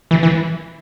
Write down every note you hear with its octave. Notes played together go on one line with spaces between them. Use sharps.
E3
E3